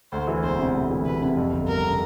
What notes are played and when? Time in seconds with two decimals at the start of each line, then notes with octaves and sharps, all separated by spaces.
0.12 D2 C5
0.27 E3
0.43 E1 C5
0.58 C3
0.74 D2
0.90 E3
1.05 E1 B4
1.21 C3
1.37 F2
1.52 G1
1.68 G1 A#4
1.83 C#3